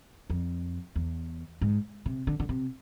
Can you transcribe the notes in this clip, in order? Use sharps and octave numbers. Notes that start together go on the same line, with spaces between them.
F2
E2
G#2
C3
D3
D3
C3